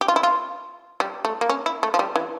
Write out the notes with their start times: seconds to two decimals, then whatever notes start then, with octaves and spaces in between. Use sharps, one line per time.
0.01 G4
0.08 F4
0.16 E4
0.23 F4
1.00 G3
1.25 A3
1.41 A#3
1.49 C#4
1.66 E4
1.83 A3
1.94 F3
1.99 G3
2.16 E3